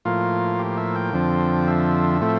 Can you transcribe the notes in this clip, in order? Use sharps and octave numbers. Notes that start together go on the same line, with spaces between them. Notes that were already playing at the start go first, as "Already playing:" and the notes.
A2 F3 A#3 F4
G4
E5
G5
F2 D3 F3 C4
E5
A2 F3 A3 C4